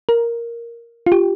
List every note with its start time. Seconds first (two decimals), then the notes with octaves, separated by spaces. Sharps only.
0.09 A#4
1.06 F4
1.12 G4